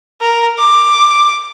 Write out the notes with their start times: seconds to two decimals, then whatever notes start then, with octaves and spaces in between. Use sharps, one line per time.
0.21 A#4
0.58 D6